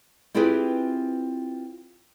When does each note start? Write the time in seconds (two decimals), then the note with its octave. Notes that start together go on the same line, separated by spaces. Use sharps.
0.34 C4 E4 F4 G4 G#4 B4